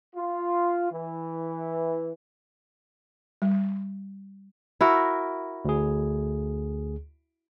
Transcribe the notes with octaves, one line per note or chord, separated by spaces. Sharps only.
F4
E3
G3
E4 F#4 A#4
D2 G#4